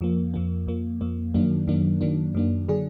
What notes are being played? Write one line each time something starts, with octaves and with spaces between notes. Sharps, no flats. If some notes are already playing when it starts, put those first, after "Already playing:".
F2 F3 A#3
F2 F3 A#3
F2 F3 A#3
F2 F3 A#3
F#2 D#3 F#3 A#3 D4
F#2 D#3 F#3 A#3 D4
F#2 D#3 F#3 A#3 D4
F#2 D#3 F#3 A#3 D4
D3 F#3 D4 G#4